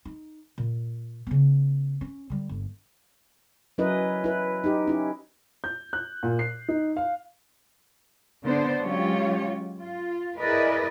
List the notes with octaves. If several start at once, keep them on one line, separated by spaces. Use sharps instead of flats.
D#4
A#2
C#3 B3
C#4
D3 G3
G1
F#3 C#4 E4 A#4 B4 D#5
E4 B4
D#4 G4
C#4 E4
G6
F#6
A#2
C7
D#4
F5
D3 B3 D4 C5
F#3 G#3 C#4 F4 G4 C#5
F4
E4 G#4 A#4 B4 D5 D#5